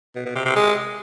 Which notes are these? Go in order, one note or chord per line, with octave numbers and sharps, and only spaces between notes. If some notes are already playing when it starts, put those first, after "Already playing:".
B2
B2
C3
C3
G#3